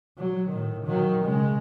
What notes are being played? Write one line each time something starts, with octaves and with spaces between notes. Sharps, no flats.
F#3
A2 D#3
D#3 F#3
C#3 G#3